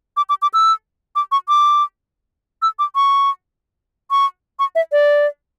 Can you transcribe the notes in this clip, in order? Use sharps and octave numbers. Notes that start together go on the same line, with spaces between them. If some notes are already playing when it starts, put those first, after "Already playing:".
D6
D6
D6
E6
D6
C#6
D6
E6
D6
C#6
C#6
C#6
E5
D5